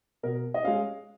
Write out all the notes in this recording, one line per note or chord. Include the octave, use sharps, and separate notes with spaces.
B2 A#4
D#5
G#3 C#4 F5